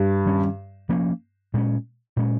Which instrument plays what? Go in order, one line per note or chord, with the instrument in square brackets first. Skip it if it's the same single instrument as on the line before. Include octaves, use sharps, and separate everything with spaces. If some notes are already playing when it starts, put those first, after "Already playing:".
Already playing: [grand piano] G2
[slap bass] D#3 G3 C#4
F3 A#3 C#4
A#2 G#3 C#4
A#2 G#3 C#4